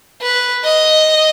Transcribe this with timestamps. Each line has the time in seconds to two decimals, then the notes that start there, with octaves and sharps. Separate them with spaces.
0.21 B4
0.64 D#5